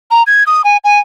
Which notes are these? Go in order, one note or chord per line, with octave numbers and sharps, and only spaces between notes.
A#5
G#6
D#6
G#5
G#5